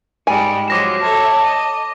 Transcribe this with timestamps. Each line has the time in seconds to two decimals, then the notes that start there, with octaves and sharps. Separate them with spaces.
0.27 G#2 G3 G#3 G#5
0.68 F3 F#3 G#3 D6 A#6 E7
1.01 A4 C#5 E5 A5
1.44 D#5